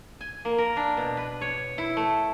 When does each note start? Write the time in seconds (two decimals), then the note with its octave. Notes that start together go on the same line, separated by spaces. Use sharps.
0.21 G#5
0.45 A#3
0.58 A#4
0.77 D4
0.97 B2
1.17 B4
1.41 C#5
1.78 E4
1.97 A3